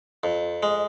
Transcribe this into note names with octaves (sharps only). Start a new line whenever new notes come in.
F2
G#3